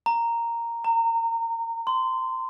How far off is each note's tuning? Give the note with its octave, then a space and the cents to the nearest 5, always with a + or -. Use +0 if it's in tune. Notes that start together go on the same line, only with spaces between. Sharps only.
A#5 -5
A#5 -25
C6 -15